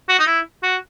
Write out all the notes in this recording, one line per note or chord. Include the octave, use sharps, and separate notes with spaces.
F#4
D#4
E4
F#4